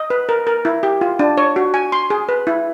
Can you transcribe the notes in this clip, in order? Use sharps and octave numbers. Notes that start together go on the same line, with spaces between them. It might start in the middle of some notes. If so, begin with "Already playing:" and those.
Already playing: D#5
B4
A#4
A#4
E4
G4
F4
D4
C#5
F#4
G#5
C6
G#4
B4
E4